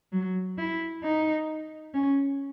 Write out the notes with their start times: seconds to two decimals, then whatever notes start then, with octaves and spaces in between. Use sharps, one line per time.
0.13 F#3
0.58 E4
1.04 D#4
1.94 C#4